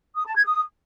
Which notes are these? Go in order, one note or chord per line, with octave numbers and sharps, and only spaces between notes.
D#6
A5
G#6
D#6